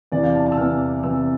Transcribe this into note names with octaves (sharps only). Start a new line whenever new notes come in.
E2 C3 E3 D5
F5
A5
A5
E6
E2 C3 E3 F6
E2 C3 E3 E6